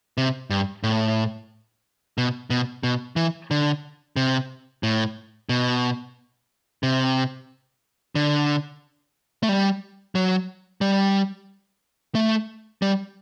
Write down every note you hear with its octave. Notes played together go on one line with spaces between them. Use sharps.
C3
G2
A2
B2
B2
B2
E3
D3
C3
A2
B2
C3
D3
A3
G3
F#3
G3
A3
G3